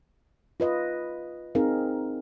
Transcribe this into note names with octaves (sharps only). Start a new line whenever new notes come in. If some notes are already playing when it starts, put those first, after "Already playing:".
F4 B4 D#5
C4 D#4 G#4 A#4 F5